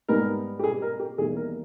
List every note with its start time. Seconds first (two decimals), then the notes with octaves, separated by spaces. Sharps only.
0.08 G#2 G3 B3 D#4 A#4
0.59 G4
0.64 G#4
0.82 A#4
0.99 G4
1.18 E2 D#3 G3 A#3 G#4
1.36 A#4